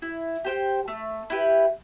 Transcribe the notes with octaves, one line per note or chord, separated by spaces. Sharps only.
E4
G4 C5 G5
A3
E4 G4 B4